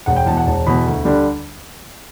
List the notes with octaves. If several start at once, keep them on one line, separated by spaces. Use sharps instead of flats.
E1 F#5
G5
E2 B2 A5
F#5
E1 A5
E2 B2 B5
D2
D3 G3 D4